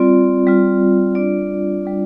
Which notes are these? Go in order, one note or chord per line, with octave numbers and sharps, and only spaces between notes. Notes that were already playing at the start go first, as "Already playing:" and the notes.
Already playing: G3 C4 F4 D5
G3 C4 F4
G3 D4 F4 D5
G3 D4 F4